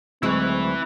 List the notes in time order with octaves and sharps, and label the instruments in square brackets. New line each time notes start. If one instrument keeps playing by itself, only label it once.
[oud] D2 F#3 G#3 [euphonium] C4 [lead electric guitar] E4 B4